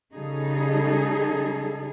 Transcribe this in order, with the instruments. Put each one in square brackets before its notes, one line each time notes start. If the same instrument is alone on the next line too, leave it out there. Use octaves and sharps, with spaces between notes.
[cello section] C#3 G3 D#4 G#4 A4